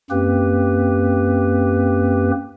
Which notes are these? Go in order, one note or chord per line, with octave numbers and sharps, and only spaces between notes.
F#2 A#3 C4 G4 B4